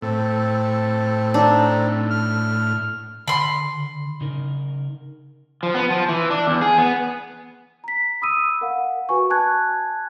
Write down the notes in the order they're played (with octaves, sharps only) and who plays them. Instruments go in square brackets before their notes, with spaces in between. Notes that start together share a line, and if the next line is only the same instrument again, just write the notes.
[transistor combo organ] A2 [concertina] C4 A4
[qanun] D4 [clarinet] D#4
[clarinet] F6
[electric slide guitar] D3 [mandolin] B5 C6
[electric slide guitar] C#3 D#4 A#4
F3
B3
F3
E3
D4
E2
G#4
B3
[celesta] A#5 B6
B5 D#6 E6 D#7
A#4 F5 F#5
F#4 B4 G#5 C#6
G#5 A5 F#6 G#6